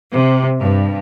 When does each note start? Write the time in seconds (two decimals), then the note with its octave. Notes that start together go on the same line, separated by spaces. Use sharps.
0.12 C3
0.59 G2